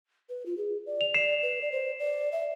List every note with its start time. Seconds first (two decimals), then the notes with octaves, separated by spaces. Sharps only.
0.29 B4
0.46 F4
0.57 G#4
0.86 D5
1.01 F7
1.14 D5 C7 E7
1.42 B4
1.62 D5
1.72 C5
1.99 D5
2.32 E5